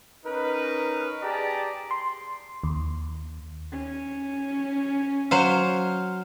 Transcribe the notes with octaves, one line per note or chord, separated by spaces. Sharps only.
C#4 D#4 A#4 B4
G4 G#4 D5 A5 A#5
C6
D#2
C#4
F#3 C5 F5